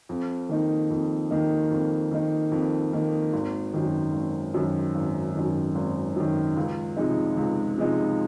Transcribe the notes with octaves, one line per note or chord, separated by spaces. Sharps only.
F2
D#3 A#3 D#4
F2
D#3 A#3 D#4
F2
D#3 A#3 D#4
F2
D#3 A#3 D#4
G#1
F#2 D#3
G#1
F#2 D#3
G#1
F#2 D#3
G#1
F#2 D#3
C#2
C3 F3 G#3 D#4
C#2
C3 F3 G#3 D#4